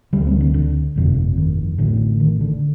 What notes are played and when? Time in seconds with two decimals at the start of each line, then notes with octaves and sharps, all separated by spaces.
0.13 D2 D3 G3
0.27 C4
0.41 D3
0.54 D3
0.96 G1 F2 C3
1.37 D#3
1.78 A1 A2 D3
2.20 D#3
2.41 D3